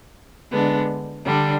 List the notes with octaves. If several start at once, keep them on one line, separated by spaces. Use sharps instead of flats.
D3 G#3 B3 D4
D3 G3 D4